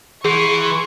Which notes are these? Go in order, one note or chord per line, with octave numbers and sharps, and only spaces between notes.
E3 G#4 C6 C#6